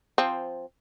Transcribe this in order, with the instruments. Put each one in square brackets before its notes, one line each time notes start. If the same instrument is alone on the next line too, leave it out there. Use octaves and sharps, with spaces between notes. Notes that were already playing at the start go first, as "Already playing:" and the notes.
[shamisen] F3 C4